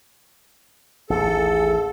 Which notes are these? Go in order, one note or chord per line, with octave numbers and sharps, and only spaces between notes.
A1 D#2 G#4 A4